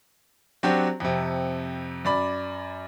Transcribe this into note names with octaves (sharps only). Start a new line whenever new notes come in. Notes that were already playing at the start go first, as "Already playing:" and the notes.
F#3 C4 D4 F#4 G4
F2 C3
F#2 D5 B5